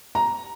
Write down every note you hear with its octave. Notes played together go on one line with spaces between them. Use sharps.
A#5